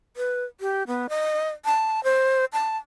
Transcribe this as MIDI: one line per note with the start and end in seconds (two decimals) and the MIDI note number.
0.17 0.44 71
0.60 0.83 67
0.87 1.07 59
1.09 1.49 75
1.65 2.03 81
2.04 2.45 72
2.53 2.77 81